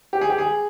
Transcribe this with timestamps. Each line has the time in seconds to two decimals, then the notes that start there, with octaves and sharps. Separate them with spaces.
0.13 G4
0.21 G#4
0.30 G4
0.38 G#4